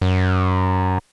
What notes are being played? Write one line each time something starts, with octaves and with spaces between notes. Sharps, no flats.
F#2